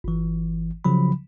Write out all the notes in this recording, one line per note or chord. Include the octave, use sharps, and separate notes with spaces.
G1 E3
C#3 F3 F#3 B5